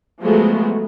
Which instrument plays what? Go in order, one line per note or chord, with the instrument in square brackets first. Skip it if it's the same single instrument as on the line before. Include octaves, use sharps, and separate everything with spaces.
[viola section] F3 F#3 G#3 A3 B3